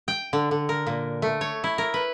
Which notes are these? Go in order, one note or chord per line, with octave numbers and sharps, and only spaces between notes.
G5
D3
D3
A#4
A#2
A3
C#5
E4
A#4
B4